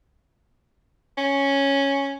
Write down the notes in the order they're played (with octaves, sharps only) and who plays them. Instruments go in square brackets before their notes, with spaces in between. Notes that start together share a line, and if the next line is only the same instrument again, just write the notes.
[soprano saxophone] C#4